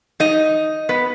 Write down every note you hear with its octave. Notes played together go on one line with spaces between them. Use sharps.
D#4 D#5
B3 B4